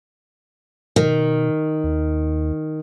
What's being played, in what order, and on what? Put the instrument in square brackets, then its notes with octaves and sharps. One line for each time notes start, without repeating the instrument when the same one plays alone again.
[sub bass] B2 [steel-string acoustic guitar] D#3
[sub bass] D#2